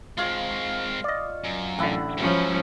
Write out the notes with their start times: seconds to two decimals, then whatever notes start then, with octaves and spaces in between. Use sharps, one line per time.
0.17 G#3 C4 F4 C#5 F5
1.04 D5 D#5
1.44 F#2
1.79 A1 D3 E4 F#5
2.17 G#2 F3 F#3 C#4